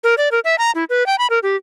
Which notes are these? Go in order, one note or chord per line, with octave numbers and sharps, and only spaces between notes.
A#4
D5
A#4
E5
A#5
E4
B4
G5
B5
A#4
G4